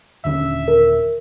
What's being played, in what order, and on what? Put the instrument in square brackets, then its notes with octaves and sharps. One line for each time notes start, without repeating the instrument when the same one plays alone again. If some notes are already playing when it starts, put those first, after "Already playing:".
[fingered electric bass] D#1 D3 C#4 [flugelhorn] E5
[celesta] A#4